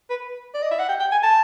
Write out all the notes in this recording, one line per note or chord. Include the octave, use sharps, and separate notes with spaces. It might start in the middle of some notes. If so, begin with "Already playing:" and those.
B4
D5
D#5
E5
F#5
G5
G5
G#5
A5